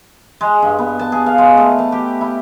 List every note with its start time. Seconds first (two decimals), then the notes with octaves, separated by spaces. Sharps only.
0.41 G#3
0.62 G2
0.79 B3
0.99 A5
1.12 G#4
1.26 F5
1.38 G#3
1.58 A3
1.79 A5
1.92 G4
2.21 E4